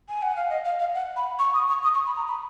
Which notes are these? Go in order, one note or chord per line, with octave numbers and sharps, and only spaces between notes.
G#5
F#5
F5
D#5
F5
F5
F#5
B5
C#6
D#6
C#6
D#6
C#6
B5
A#5
B5